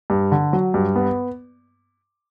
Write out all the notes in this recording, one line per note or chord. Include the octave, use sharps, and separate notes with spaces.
G2
D3
F#3
G2
B3